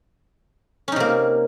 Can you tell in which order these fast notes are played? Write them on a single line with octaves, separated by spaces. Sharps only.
C#4 D#4 C3 A#3